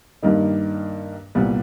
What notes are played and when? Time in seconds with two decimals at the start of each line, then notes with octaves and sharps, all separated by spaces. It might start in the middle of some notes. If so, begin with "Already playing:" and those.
0.23 G2 D#3 G3 A#3 D#4
1.35 C2 A#2 G3 B3